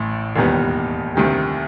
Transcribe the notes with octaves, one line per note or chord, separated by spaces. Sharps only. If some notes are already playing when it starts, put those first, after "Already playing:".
Already playing: A1 A2
E1 D#2 D#3 G3 B3
D2 C3 D#3 G3